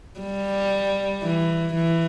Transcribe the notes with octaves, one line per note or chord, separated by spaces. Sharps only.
G3
E3
E3